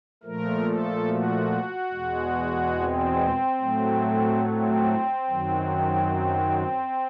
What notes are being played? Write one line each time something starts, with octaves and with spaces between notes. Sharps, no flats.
A#2 F3 A3 A#4
A4
F#4
E2 B2 G#3
C4
A2 F#3 A3
C4
F#2 D#3 F#3